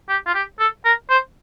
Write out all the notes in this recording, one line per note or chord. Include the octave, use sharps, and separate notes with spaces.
G4
F4
G4
A4
A#4
C5